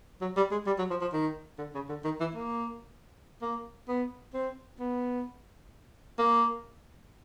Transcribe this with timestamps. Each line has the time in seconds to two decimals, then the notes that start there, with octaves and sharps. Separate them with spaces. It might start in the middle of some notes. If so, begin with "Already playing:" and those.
0.21 F#3
0.36 G3
0.51 G#3
0.66 G3
0.78 F#3
0.90 F3
1.01 F3
1.13 D#3
1.58 D3
1.74 C#3
1.89 D3
2.04 D#3
2.20 E3
2.34 A#3
3.42 A#3
3.88 B3
4.33 C4
4.79 B3
6.18 A#3